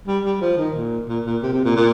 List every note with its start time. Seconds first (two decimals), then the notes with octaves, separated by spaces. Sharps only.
0.07 G3
0.25 G3
0.41 F3
0.57 D#3
0.74 A#2
1.08 A#2
1.25 A#2
1.43 C3
1.53 C3
1.65 A#2
1.76 A#2